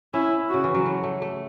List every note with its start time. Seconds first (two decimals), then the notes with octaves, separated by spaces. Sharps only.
0.14 C#4 E4
0.49 C#3 F#4
0.64 E3
0.75 F#3
0.86 A3
1.03 A3
1.22 A3